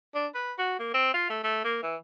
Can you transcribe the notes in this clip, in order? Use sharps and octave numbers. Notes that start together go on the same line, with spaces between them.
D4
B4
F#4
A#3
C4
F4
A3
A3
A#3
E3